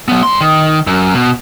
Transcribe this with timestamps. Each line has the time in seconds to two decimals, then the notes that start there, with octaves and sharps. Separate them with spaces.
0.08 F#3 B3
0.23 G2 C6
0.41 D#3
0.87 F#2
1.14 B2